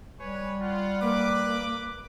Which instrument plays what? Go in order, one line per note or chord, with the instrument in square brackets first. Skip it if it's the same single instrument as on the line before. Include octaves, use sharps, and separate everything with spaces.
[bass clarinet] G3 [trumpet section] B4 C#5 G#5
[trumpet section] F4 F#5
[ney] A#3 [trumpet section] B4 D6